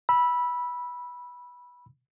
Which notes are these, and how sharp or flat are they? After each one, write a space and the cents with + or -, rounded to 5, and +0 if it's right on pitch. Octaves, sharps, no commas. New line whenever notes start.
B5 -15 E6 +0